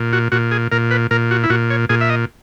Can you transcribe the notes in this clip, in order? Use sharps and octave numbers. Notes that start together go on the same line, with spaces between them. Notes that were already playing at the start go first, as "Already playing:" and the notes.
Already playing: A#2
F#4
A#2 F#4
G#4
A#2 A#4
B4
A#2 A#4
F#4
E4
A#2 F#4
C#5
A#2 G#4
E5
D#5